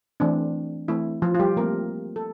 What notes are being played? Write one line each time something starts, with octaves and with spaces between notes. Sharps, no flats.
E3 A3 C4 D4
E3 A3 C4 E4
F3 F4
F4
G3 G4
F3 A3 A#3 C4 A#4
A4